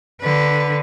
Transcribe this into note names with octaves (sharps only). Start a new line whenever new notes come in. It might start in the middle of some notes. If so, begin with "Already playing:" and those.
D3 B4